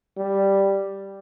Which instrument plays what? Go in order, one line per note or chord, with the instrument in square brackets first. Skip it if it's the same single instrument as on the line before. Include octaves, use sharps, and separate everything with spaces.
[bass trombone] G3